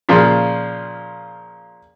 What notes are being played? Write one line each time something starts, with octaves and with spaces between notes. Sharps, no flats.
A#2 C#3 F3